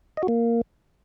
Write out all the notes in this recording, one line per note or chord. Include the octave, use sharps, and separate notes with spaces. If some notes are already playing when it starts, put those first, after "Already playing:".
D#5
F#4
A#3